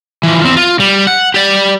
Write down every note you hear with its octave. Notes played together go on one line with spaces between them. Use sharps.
E3 F3
E2 C4
F4
G3
F#5
G4 D5